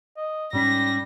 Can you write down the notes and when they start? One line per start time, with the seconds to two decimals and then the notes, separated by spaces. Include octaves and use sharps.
0.17 D#5
0.53 G#2 G3 C#4 A#6 B6